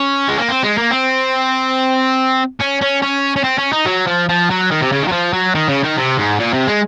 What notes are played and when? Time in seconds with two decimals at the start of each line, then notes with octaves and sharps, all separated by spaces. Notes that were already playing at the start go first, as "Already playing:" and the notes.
Already playing: C#4
0.28 G#3
0.39 A#3
0.49 C4
0.63 G#3
0.78 A#3
0.91 C4
2.60 C#4
2.81 C#4
3.02 C#4
3.36 C#4
3.44 C4
3.58 C#4
3.73 D#4
3.86 F#3
4.07 F3
4.29 F3
4.50 F#3
4.71 D#3
4.82 C3
4.92 C#3
5.03 D#3
5.08 F#3
5.12 F3
5.33 F#3
5.55 D#3
5.68 C#3
5.83 D#3
5.97 C3
6.17 G#2
6.39 A#2
6.53 C3
6.67 G#3